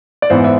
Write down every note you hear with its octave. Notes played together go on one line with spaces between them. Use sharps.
D5
G#2 E3 B3 C5 E5
E5